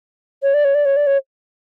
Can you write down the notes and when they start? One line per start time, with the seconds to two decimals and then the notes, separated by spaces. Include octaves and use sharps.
0.43 C#5
0.54 D5
0.64 C#5
0.75 D5
0.85 C#5
0.96 D5
1.07 C#5